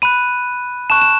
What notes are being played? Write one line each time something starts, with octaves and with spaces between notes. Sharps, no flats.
B5 F#6 D#7
A5 C#6 F#6 E7
E7